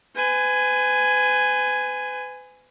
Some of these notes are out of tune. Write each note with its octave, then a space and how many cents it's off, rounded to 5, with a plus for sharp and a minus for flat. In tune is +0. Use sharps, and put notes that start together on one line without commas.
B4 +40 G#5 +0